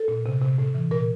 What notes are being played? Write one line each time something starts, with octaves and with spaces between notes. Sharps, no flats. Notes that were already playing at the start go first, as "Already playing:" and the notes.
Already playing: A4
A#2
C3
C3
A2
E3
A#2 A#4